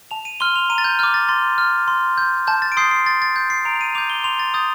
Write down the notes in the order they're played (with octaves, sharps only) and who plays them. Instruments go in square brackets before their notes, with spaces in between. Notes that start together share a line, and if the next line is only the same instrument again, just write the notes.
[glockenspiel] A5 F7
D#7
C6 F6 G7
F7
A#5 D#7
A6
G6
D6 F6 G6
A6
C6 A6
F6
C6
G6
A5 G6
A6
D7
C6 D#6 G6 C7
C7
C6 A6
A6
G6
C7
A#5 D7
F7
D#7
D6 G6 F7
G7
C6 F7
A6
D#6 G6 A6